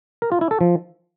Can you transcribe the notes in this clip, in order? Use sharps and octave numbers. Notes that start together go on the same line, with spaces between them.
A#4
F4
E4
A4
F3